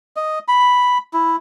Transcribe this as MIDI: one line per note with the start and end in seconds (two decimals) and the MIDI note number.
0.16 0.39 75
0.48 0.98 83
1.13 1.36 64